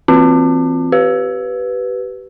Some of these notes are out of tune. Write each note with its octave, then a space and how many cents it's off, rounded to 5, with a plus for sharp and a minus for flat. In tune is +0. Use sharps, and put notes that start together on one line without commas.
E3 +0 C4 +0 F4 +0
G4 -25 B4 +0